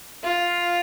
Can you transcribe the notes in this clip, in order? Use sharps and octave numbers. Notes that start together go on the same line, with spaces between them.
F4